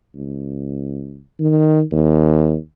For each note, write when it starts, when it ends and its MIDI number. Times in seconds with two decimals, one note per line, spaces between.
0.15 1.21 37
1.40 1.82 51
1.92 2.57 39